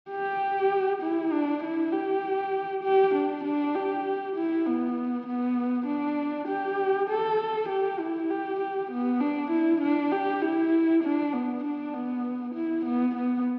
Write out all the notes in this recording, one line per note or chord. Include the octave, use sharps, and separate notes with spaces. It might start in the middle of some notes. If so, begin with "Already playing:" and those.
G4
E4
D4
E4
G4
G4
D4
D4
G4
E4
B3
B3
D4
G4
A4
G4
E4
G4
G4
B3
D4
E4
D4
G4
E4
D4
B3
D4
B3
E4
B3
B3